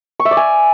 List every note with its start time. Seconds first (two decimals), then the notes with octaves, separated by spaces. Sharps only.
0.19 C#6
0.25 E5
0.31 D5
0.37 G#5